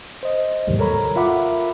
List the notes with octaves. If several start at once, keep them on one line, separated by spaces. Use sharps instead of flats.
C5 D#5
D#2 G#2 C3 D#3 F#3 G3
A4 A#4 C#5 A#5 B5
F4 A#4 E5 F#5 B5 D6